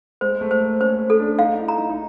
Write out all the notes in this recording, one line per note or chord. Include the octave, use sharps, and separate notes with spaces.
G#3 C5
A3
C5
A#3
C#4 C5
A4
D4
D#4 F5
E4
A#5
D#4
D#4